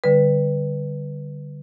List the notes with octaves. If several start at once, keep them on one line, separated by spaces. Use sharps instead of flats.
D3 G3 B4